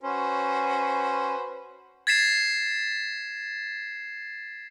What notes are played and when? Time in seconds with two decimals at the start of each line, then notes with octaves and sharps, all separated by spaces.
0.03 C#4 F#4 B4 C5
2.07 G#6 A6 B6 C7 E7